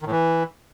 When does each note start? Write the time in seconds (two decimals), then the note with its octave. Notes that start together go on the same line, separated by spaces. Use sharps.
0.01 D#3
0.06 A2
0.11 E3